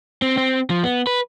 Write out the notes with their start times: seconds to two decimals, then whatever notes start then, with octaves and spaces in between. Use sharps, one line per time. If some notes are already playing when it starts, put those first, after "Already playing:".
0.22 C4
0.38 C4
0.70 F3
0.84 B3
1.07 B4